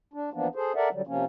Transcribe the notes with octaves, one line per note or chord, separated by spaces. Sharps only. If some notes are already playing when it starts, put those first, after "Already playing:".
D4
E3 F3 A#3 B3 D4
G#4 A4 C5
A4 A#4 D5 E5 F#5
D3 F#3 G3
C3 F3 A#3 C#4